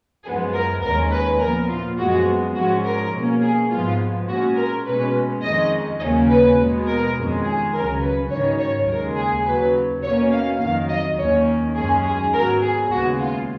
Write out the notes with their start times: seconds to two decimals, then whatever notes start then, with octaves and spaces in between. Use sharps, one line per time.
0.25 F#2 F3 G#3 B3 G#4
0.54 A#4
0.82 D#2 D#3 G#3 C#4 A#4
1.11 B4
1.40 A#2 F3 B3 A#4
1.69 F4
1.98 F#2 F3 G#3 B3 F#4
2.55 G#2 F3 G#3 C#4 F#4
2.84 A#4
3.13 B2 A#3 C#4
3.41 G#4
3.70 G#2 F3 G#3 B3 F4
4.28 A#2 G#3 C#4 F#4
4.56 A#4
4.85 B2 G#3 C#4 B4
5.42 F2 D#3 G#3 C#4 D#5
6.00 D#2 C#3 F#3 A#3 C#4 D#5
6.29 B4
6.58 B2 G#3 B3
6.87 A#4
7.16 F2 D#3 G#3 C#4
7.44 G#4
7.73 C#2 C#3 F#3 C#4 A#4
8.01 B4
8.30 G#2 D#3 F#3 C#4 C#5
8.59 C#5
8.88 D#2 C#3 G#3 A#4
9.17 G#4
9.45 D#2 C#3 F#3 B4
10.03 B2 A#3 C#4 C#5
10.32 F5
10.60 F2 D#3 F#3 F5
10.89 D#5
11.18 D#2 D#3 A#3 C#4 C#5
11.76 F#2 D#3 G#3 C#4 G#4
12.04 G#4
12.33 G#2 F#3 B3 A#4
12.62 G#4
12.90 D#2 C#3 G#3 B3 F#4
13.19 F4